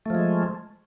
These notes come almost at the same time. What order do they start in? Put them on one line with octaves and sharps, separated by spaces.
A3 F3 G#3